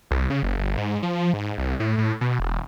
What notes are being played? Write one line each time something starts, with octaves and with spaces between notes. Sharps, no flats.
C2
C#3
F#1
G1
G#2
F3
G#2
C2
A2
A2
B2
E1